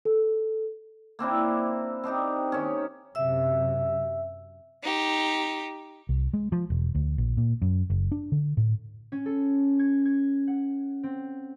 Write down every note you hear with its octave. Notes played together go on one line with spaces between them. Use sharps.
A4
A#3 C4 D4 E4
C4 D4 D#4 G4
D#3 C#4
F#2 C3 E5 E6
D#4 G4
C2
G#3
F3
E1
D2
A#1
A#2
F#2
F#1
D4
D3
A2
C#4
A4
G#6
G#6
F#5
C4